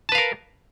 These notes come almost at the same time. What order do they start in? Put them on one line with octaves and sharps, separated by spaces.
A5 B4 F5 A#4